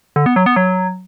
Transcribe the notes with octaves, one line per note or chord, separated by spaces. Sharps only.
D3
B3
F#3
B3
F#3